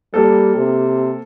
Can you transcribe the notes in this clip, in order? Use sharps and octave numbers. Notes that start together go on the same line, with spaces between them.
G3 A#3 A4
C3